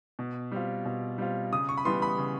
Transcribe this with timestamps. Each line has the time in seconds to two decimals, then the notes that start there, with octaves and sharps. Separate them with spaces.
0.19 B2
0.52 G3 C4 F4
0.85 B2
1.18 G3 C4 F4
1.52 C#3 D#6
1.69 C#6
1.77 B5
1.85 E3 G3 B3 C6
2.02 B5
2.18 C#3